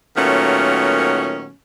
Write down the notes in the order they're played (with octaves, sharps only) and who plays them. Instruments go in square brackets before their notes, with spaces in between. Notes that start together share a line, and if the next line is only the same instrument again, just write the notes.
[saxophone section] A#2 D#3 F#3 A3 B3 C#4